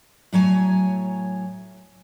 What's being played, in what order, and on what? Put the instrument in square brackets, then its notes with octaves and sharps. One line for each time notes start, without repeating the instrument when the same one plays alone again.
[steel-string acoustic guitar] A2 F#3 C#5 G#5